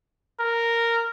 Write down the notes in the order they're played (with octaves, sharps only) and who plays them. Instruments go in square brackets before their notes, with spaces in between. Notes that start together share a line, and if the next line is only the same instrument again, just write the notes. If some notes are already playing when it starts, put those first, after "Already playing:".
[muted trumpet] A#4